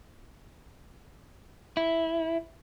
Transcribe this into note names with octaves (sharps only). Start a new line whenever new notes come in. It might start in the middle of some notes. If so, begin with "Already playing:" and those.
E4